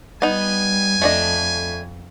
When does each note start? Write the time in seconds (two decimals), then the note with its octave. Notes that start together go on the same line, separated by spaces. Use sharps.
0.22 G3 B3 D#4 G#5
1.02 F2 A3 D4 D#5